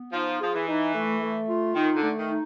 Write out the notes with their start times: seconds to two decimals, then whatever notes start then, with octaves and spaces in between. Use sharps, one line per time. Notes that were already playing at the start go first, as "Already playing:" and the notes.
Already playing: B3
0.12 F3 D#4
0.40 F3 G#4
0.54 E3
0.67 D#4
0.94 A3
1.21 A3
1.48 F4
1.75 D#3 D#4
1.96 D3
2.03 A3
2.17 D#3
2.30 D#4